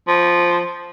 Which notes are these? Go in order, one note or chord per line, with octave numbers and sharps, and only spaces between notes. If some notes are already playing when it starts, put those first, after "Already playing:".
F3